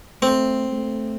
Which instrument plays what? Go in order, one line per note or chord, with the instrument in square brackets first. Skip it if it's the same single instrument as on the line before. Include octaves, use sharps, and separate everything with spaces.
[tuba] A3 [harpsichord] C4
[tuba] A3